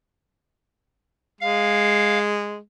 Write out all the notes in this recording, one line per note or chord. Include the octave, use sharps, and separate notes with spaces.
G#3 F5